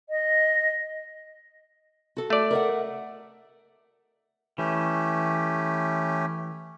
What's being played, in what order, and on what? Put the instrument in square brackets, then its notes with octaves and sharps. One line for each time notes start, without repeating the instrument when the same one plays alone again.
[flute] D#5
[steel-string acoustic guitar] F#4 A4
[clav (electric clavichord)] A3 D5
[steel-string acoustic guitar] A#4 E5 F#5
[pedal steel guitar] E3 [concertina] A3 C#4 G4